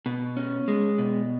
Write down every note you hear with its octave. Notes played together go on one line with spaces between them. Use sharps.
B2
C#4
G#3
B2